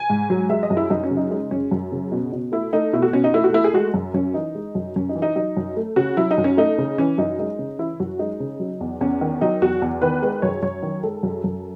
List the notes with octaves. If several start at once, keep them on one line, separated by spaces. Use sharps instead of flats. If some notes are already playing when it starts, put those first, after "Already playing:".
Already playing: G#5
G#2
F#3
G#3 E5
D#5
F#2
E4
F#2 D#4
C#4
C#3
D#4
G#3 D#4
F#2 C#4
F#2
C#3
B2
B2
A3 E4
A3 D#4
B2 E4
F#4
B2 C#4
D#4
A3 E4
F#4
A3 E4
G#4
G#3 F#4
F#2
F#2 C#4
E3 D#4
G#3
F#2
F#2 C#4
D#4
E3
D#4
F#3 D#4
F#2
A3
C#3 F#4
F#3 E4
D#4
F#2
C#4
A3 D#4
C#3
E3 C#4
F#2 D#4
G#3 D#4
C#3
E3 E4
F#2 F#4
G#3 D#4
C#3
F#3
E2
E2 C#4
D#3
F#3 D#4
E2 F#4
E2
D#3 B4
G#3 B4
F#2 C#5
F#2 C#5
D#3
G#3 A4
F#2
F#2